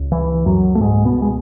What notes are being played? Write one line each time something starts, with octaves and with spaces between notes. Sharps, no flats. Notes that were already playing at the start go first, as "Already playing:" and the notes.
Already playing: C#2
E3
F#2 F#3
A3
G#2 G#3
B2 B3
G#3